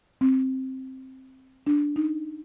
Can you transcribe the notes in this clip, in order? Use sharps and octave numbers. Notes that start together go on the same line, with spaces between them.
C4
D4
D#4